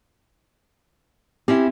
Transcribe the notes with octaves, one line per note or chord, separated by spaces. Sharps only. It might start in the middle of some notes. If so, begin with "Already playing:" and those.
C4 C#4 E4 G4